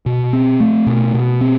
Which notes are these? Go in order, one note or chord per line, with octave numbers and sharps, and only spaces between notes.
B2
C4
A3
B2
B2
C4